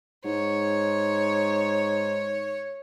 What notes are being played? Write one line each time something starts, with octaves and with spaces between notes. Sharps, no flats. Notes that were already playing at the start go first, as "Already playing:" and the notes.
G#2 C#5